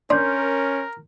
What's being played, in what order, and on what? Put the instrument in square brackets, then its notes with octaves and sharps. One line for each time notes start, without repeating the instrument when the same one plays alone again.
[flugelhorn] C#4 [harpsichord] D4 [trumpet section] A#4 [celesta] C6 G6